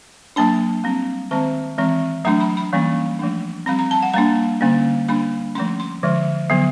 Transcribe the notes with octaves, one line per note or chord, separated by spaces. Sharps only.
F#3 A#3 D4 A5
G3 C4
D#3 G#3 C4 A5
E3 G#3 C4
F#3 A3 D4 A#5
B5
B5
E3 G3 A#3 C#4
F3 A3 D4
G3 C4 B5
A#5
A5
F#5
G3 A#3 D4 A#5
D3 G3 A#3 C#4
G3 A#3 D4 B5
F3 A3 C#4 C6
C6
D3 F3 G#3
D3 F#3 B3